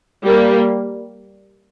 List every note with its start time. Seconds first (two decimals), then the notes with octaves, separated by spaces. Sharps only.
0.24 G3 A#3